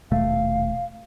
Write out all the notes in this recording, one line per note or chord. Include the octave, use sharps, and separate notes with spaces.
D#1 B2 A3 F5